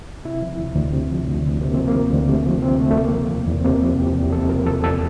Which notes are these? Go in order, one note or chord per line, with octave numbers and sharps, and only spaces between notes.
C3 E4
F3
D2
D2
C3
F3
D2
D2
C3 A#3
F3 C4
A#3
D2
D2
C3 A3
F3
D2 C4
D2 A3
A3
C3 A#3
F3
E2
E2
C4
C3 A#3
F3
E2 G4
E2
C3 A4
F3 A#4
E2 A4
E2 A4